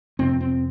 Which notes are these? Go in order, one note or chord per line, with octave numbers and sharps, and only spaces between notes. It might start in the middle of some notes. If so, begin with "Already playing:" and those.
F2 C3 C4
C4